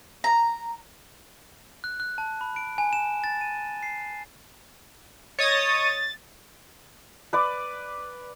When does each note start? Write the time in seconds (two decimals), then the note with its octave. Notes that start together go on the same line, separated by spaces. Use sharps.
0.24 A#5
1.84 F#6
2.00 F#6
2.18 A5
2.41 B5
2.56 D7
2.78 G#5
2.93 E7
3.24 A6
3.41 D#7
3.83 C7
5.39 C#5 D#5 D#6 A6
7.33 B4 D5 D6